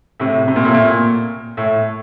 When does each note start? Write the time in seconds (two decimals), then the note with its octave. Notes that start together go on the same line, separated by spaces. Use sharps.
0.20 A2 C3
0.48 C3
0.56 A#2
0.65 A2
0.74 A#2
1.57 A2